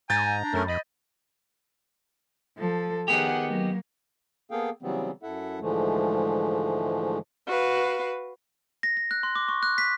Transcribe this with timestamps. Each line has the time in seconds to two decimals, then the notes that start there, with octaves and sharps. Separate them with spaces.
0.10 G#2 G#5 A#5 G6 A6
0.41 D4
0.53 F#2 A3 C#4 A#4
0.68 F2 D#5 B5
2.58 F3 A4
3.08 D#3 B3 G4 G#4 F#5
3.48 F#3 A#3
4.51 A#3 B3 G#4 A4 F5 G5
4.82 C#3 E3 F#3 G3 B3 C4
5.23 F#2 E4 A4 E5 F#5
5.60 G#2 D3 E3 F3 G#3 A3
7.47 F#4 B4 F5
8.83 A#6
8.97 A#6
9.11 F#6
9.23 C6
9.36 D6
9.48 C#6
9.63 F#6
9.78 B6